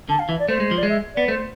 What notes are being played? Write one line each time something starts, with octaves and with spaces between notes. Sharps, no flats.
D3 A5
F5
E3 E5
D5
A3 C5
G#3
F3
D5
G#3
E5
B3 D5
A3 C5